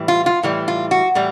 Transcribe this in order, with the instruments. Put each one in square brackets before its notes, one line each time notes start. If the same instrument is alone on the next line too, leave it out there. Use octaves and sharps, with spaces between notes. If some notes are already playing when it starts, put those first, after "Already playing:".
Already playing: [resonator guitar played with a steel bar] A2 E3 G3
F4
F4
A2 E3 G3
F4
F#4
A2 E3 G3